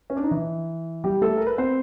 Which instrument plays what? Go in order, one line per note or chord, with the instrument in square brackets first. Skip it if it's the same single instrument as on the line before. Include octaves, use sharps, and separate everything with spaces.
[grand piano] C#4
D4
D#4
E3 E4
G3 G4
A3 A4
A#4
B4
C4 C5